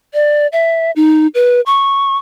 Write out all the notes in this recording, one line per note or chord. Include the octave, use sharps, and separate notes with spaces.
D5
E5
D#4
B4
C#6